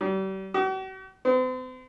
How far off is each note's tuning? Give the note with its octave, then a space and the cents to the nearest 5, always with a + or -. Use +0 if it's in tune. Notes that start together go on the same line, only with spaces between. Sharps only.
G3 -40
F#4 +45
C4 -45